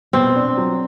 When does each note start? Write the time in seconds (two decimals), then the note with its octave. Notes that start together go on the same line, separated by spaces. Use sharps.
0.13 B2 C4
0.36 D4
0.58 F#3